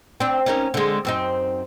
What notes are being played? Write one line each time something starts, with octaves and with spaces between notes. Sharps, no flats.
C4 D4
C#4 D#4 A#4
D3 G#3
F#2 C4 D#4